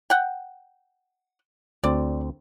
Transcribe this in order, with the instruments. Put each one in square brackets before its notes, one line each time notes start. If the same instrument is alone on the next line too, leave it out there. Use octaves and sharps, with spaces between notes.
[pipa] F#5 G5
[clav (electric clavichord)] D2 C4 [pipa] D5